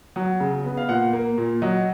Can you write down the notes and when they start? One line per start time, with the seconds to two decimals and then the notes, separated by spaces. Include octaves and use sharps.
0.16 F#3
0.40 C#3
0.64 B3
0.77 F5
0.89 A#2 F#5
1.13 A#3
1.38 A#2
1.62 F#3 D#5